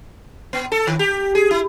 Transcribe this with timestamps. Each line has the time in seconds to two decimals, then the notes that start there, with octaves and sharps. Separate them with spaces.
0.53 B3
0.72 A4
0.87 D#3
0.99 G4
1.35 G#4
1.51 E4